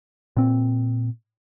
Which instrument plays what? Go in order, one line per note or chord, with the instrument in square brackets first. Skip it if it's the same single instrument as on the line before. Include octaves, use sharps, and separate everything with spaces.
[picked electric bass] A#2 C4